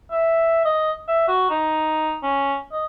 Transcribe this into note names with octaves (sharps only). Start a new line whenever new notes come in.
E5
D#5
E5
F#4
D#4
C#4
D#5